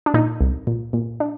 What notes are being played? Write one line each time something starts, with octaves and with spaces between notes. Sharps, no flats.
D4
A#2 D#4
C2
A#2
A#2
D4